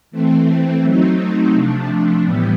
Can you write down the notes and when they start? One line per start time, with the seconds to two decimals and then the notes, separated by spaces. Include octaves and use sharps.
0.11 E3 A3 C4
0.82 F#3 A3 C4 D#4
1.53 C3 F3 A3 D4
2.24 A2 E3 G3 B3